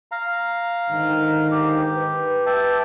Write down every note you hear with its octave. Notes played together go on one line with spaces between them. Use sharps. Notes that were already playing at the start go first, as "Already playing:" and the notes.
F5 A#5
G#2 D3 D#3
G4
B4
E5 G5 A5